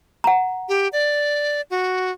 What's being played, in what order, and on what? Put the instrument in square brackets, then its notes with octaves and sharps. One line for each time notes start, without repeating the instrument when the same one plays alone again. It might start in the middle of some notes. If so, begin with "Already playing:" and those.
[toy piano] F#5 A#5
[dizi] G4
D5
F#4